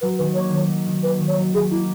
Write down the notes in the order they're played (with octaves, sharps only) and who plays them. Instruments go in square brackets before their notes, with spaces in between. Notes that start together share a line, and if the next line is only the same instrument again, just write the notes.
[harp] F#3 [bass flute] B4
[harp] D#3 [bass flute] B4
[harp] A#3 [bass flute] C#5
[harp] D#3
F#3
D#3
[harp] A#3 [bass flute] B4
[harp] D#3
[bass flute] C#5
[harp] F#3
[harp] D#3 [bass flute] G#4
[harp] A#3 [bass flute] E4